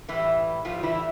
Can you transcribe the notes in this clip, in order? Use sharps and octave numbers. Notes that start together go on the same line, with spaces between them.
A2 E3 G3 E4
A2 F3 G3 F4
E3 E4